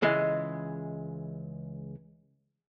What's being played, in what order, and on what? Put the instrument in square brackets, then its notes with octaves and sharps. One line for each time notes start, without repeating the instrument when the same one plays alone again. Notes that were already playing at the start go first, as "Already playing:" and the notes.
[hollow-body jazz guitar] C#2 E3 G#3